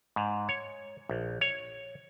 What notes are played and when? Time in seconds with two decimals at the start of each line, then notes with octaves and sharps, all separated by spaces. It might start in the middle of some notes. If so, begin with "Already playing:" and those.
0.16 G#2
0.49 C#5
1.09 A#1
1.41 C#5